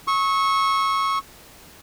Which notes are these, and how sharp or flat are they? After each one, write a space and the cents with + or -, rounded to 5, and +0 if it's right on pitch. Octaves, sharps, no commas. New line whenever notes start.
C#6 -15 E6 -40